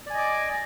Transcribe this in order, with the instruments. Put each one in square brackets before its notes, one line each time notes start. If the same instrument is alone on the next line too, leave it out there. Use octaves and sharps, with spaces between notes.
[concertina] D5
G#5
D#5
D6